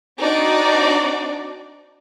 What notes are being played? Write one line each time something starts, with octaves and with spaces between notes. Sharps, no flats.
C4 D4 D#4 F#4 D5